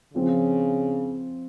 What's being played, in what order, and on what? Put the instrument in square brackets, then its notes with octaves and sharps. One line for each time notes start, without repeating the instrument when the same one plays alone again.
[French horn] C#3 [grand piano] F3 C4 F4